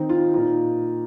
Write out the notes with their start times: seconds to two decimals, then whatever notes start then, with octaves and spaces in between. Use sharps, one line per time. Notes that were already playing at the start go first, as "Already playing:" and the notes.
Already playing: D#3 C4 D#4
0.09 F4
0.34 A#2 A#3 D#4 F4